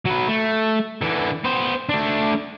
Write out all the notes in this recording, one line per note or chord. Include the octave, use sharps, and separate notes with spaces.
F#3 B4
A3
D3 E3
B3 C5
A3 D4